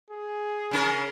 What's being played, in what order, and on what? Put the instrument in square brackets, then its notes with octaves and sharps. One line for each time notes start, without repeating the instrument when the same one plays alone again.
[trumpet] G#4
[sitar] C#3 C#4 A#4